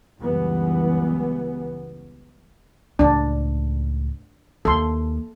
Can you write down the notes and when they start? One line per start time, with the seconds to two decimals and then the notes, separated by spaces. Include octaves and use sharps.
0.20 C#2 F#2 E3 G3 B3
2.99 C#2 A2 D4
4.65 D#2 A#3 A4 C6